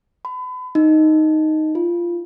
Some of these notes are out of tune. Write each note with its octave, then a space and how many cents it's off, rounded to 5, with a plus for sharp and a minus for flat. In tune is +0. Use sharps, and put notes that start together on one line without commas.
B5 +35
D#4 +0
F4 -15